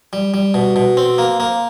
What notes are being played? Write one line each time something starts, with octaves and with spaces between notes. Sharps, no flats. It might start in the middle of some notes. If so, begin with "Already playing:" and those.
G3
G3
B2
B2
C4
A#3
A#3